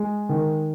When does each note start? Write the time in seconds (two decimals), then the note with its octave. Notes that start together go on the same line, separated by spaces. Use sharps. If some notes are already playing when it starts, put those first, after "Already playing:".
Already playing: G#3
0.29 D#3